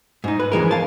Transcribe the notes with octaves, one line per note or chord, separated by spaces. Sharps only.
G#2 D#4
B4
F2 E3 G#3 A#4
F5 A5